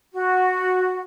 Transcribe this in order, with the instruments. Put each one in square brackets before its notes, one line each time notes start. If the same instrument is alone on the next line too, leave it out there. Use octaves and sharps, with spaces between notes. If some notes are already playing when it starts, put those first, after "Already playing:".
[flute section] F#4